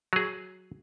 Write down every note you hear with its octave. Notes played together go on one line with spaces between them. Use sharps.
F#3 G#4